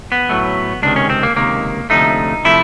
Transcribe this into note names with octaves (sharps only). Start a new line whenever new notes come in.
B3
A2 F#3 A3
C#2 C3 D#3 D4
C#4
C4
A#3
C#2 C3 D#3 A#3
D2 C3 F3 A3 D#4
C3 F3 A3 E4